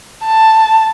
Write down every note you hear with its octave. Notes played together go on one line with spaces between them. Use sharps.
A5